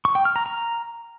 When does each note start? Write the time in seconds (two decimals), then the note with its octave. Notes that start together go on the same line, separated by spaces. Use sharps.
0.05 C#6
0.15 G5
0.25 F6
0.36 A#5
0.46 A#5